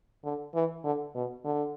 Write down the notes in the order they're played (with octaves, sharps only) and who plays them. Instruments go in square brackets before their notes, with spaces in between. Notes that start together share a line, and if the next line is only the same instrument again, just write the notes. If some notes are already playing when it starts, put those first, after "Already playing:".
[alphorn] D3
E3
D3
B2
D3